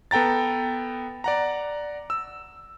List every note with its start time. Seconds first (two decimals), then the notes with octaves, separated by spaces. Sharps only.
0.11 B3 A4 G5 A#5 A6
1.24 D5 F#5 A#5
2.10 E6